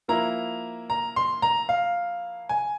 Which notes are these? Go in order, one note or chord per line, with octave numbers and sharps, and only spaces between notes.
F3 A#3 E4 A#5
A#5
C6
A#5
F5
G#5